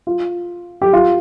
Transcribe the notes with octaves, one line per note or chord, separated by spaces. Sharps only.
F4
G4
F4